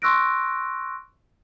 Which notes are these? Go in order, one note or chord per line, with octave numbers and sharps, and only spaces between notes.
C6 C#6 E6 F#6 A#6 D7